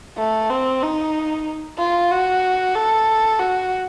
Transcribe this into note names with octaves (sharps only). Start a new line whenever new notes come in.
A3
C4
D#4
F4
F#4
A4
F#4